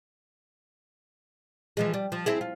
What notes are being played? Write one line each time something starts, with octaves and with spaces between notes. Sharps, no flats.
E3 F3 G#3
G3
F3
C4 E4 G#4
F4